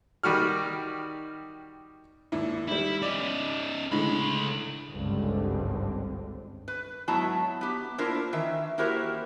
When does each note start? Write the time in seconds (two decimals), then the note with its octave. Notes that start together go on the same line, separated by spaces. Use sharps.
0.23 D#3 G3 F#4 F6
2.32 G#1 D#2 E4
2.68 D#3 G3 E4
3.02 C#4 D#4 D5 F#7
3.91 C#2 A2 D3 G#3 B5
4.89 G#1 C#2 G2 D3 G3 C4
6.68 B4
7.08 G#2 F#3 B3 E4 A5 A#5
7.61 B3 G4
7.98 A#3 D4 E4 F4 A#4 C5
8.33 D#3 E3 E5
8.78 A#3 E4 F#4 G4 A#4 C5